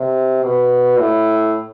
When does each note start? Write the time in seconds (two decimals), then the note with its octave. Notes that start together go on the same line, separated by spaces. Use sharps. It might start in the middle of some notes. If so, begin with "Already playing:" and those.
Already playing: C3
0.44 B2
0.99 A2